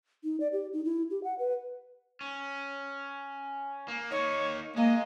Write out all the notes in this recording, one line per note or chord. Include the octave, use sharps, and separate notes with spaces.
D#4
D5
G4
D#4
E4
G4
F#5
B4
C#4
A#3
A#3 D#4 C#5
G#3 A#3 D#5